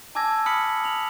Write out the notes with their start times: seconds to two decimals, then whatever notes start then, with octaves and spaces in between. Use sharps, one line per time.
0.15 G#5 A5 D6 E6 G#6 A#6
0.46 B5 D#6 F6 B6 C#7 F#7
0.84 F7 F#7